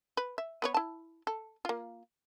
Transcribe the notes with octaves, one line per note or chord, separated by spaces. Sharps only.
B4
E5
B3 B4 C#5
E4 A5
A4
A#3 F4